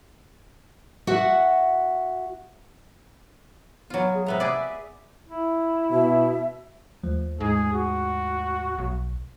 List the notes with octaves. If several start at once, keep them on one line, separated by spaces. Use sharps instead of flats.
F#4 E5 F#5
F#3 B3 F4
G#4
C3 B3 E5 A#5
G#4 B4 D5
E4
B2 E5
D#2 F3 A3
G#2 G#4
F#4
B1